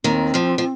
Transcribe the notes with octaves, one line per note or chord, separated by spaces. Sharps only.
D#2 D#3 C4
F2 F3
F3